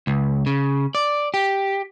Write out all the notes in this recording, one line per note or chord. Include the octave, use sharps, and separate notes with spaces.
C#2
C#3
D5
G4